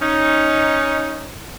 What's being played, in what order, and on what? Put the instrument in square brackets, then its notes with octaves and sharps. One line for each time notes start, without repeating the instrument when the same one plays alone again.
[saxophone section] C#4 D#4